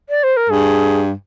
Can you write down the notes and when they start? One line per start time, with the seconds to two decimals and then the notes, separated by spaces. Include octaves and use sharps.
0.09 D5
0.23 C5
0.37 A#4
0.50 G2 G#4